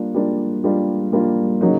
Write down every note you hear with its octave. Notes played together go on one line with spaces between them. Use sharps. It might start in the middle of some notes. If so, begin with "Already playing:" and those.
Already playing: G3 A#3 D4 F4
G3 A#3 D4 F4
G3 A#3 D4 F4
G3 A#3 D4 F4
C#3 F#3 A#3 D#4